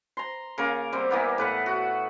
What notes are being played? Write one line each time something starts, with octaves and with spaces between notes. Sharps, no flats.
A#5 C6
C#3 A#3 A#4
G3 C4
E3 A#3 B3
A2 B4 F#5
F#4